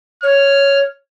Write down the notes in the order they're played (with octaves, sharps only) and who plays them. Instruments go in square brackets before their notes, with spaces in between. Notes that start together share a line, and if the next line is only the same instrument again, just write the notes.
[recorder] C#5 [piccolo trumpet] F6